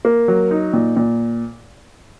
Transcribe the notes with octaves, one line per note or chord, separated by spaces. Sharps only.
A#3
F#3
D#4
A#2
A#2